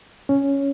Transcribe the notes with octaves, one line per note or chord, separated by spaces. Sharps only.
C#4